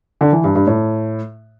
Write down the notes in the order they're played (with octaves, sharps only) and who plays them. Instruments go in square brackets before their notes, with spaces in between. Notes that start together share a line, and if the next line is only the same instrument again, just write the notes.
[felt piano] D3
E3
G2
G2
A2